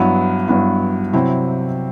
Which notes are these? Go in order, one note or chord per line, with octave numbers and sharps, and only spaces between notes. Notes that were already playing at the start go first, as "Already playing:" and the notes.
Already playing: G2 F#3 B3 E4
G2 F#3 B3 E4
C3 F#3 C4 E4